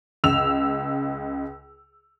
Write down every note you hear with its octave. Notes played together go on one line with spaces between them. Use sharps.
C#2 E6 F7